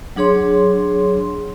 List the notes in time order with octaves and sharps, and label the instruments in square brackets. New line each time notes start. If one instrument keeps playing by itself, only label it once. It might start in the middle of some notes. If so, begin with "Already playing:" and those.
[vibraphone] F#3 D4 G#4 C#5 C6